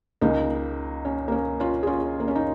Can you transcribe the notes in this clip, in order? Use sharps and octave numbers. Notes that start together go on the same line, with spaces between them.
C#2 C#3 G#3 A#3 D#4
C#4
A#3
C#4
C#4 F4
G#4
C#4 F4
A#3
C#4
D#4